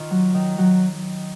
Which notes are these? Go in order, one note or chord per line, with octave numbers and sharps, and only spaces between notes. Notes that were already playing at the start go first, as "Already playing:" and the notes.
Already playing: D#3 F4 C#6
F#3
D#3
F#3